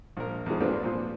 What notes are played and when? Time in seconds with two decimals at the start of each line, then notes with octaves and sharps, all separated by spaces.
0.17 A#1 A#4
0.46 E2 D#3 F3 G#3
0.61 G#2 D3 B3 C4 D4 F4
0.83 A#2 F3